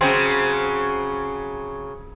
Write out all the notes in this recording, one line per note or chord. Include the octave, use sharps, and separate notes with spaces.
C#3 F#3 C4